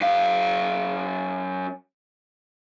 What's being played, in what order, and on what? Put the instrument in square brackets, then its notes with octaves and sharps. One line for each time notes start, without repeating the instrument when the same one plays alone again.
[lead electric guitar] F#2 F5